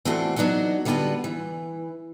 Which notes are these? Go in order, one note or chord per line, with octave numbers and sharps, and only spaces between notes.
E3 A3 C4 D4 F4 F#4
F#3 B3 D4 D#4 F#4
D3 G3 B3 F4 F#4 B4
E3